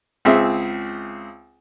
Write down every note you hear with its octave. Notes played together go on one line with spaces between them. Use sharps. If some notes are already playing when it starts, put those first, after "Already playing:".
C#2 C4 G#4 E5